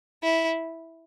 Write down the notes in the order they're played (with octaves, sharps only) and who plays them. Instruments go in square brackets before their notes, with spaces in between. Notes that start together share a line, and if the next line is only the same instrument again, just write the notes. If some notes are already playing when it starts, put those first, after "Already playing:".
[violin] E4